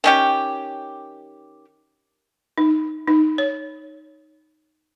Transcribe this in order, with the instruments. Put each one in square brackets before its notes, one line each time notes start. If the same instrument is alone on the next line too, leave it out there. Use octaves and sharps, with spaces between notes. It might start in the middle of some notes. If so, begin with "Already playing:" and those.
[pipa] D#3 C#4 G4
[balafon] D#4
D#4
C#5